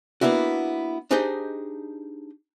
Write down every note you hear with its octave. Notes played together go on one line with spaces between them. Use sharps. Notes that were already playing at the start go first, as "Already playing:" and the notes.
A#3 B3 D4 E4 F#4
D4 D#4 G4 G#4 C5 D#5